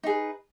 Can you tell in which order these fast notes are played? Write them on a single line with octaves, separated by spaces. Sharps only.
D#4 G#4 B4